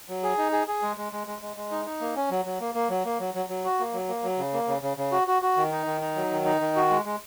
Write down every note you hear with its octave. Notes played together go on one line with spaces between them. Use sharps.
F#3
G#4
D#4
G#4
G#4
G#3
G#3
G#3
G#3
G#3
G#3
D#4
D#4
A#3
C#4
F#3
F#3
A#3
A#3
F#3
A#3
F#3
F#3
F#3
F#4
A#3
F#3
A#3
F#3
C#3
A#3
C#3
C#3
C#3
F#4
F#4
F#4
D#3
D#4
D#3
D#4
F#3
D#3
D#4
D#3
F#4
G#3
G#3